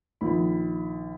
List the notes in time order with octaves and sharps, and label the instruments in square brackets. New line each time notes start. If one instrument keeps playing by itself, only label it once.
[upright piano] A#1 D#3 B5